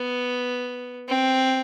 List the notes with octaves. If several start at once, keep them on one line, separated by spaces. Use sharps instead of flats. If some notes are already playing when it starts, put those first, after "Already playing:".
Already playing: B3
C4